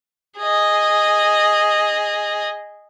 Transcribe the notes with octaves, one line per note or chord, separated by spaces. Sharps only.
G#4 D#5